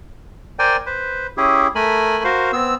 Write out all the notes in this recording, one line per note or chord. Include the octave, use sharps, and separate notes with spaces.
A#4 C5 D5 G5 G#5
B4 C5
C#4 E4 G4 G#4
A3 A#4 G#5 B5
F#4 A#4 C5 F5
B3 C4 E6